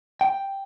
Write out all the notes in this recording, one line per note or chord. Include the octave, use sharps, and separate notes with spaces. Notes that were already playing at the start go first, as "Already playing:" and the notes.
G5